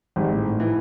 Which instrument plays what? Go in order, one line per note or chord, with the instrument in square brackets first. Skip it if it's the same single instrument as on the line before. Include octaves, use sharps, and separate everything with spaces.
[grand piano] G#1 [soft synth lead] G3
[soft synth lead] A2
[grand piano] E3